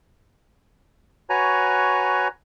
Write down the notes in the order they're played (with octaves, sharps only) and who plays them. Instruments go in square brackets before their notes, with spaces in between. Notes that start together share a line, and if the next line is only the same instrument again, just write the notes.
[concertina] F#4 B4 C#5 G#5 A#5